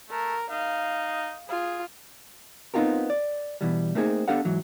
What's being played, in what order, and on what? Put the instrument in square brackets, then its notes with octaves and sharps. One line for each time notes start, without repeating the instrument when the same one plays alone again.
[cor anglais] A3 [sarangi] A#4
[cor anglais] D#4 [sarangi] F5
[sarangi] F4 [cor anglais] G#4
[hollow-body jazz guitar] B3 C4 D#4 F4 G4 A#4
D5
B2 E3 G3
A3 A#3 C4 D#4 G#4
B3 D4 G4 A4 F5 F#5
G#2 E3 F#3